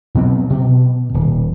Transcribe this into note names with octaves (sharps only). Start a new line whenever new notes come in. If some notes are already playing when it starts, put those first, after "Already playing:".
B2 F#3 B3 C4
B2
D#1